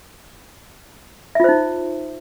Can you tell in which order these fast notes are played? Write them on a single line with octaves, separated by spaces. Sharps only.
E5 F4 C5 D#4